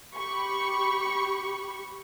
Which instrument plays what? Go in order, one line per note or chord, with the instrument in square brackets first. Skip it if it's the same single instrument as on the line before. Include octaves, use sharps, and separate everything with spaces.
[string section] G4 B5 C#6